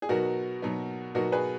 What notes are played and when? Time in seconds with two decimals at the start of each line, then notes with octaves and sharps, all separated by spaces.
0.02 G#4
0.09 B2 F#3 B3 D#4 F#4 A#4
0.62 B2 F#3 B3 D#4
1.15 B2 F#3 B3 D#4 F#4 A#4
1.32 G#4 B4